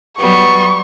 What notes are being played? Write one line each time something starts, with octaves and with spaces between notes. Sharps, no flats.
F#3 G3 B3 C#6